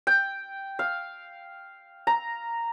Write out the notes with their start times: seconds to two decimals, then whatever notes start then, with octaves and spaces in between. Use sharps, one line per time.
0.07 G5
0.79 F5
2.07 A#5